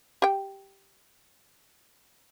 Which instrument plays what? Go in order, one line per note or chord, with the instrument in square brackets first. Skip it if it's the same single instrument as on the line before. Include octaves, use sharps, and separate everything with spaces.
[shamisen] G4 G5